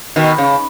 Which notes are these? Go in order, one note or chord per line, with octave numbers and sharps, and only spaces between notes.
B2 D#3
C#3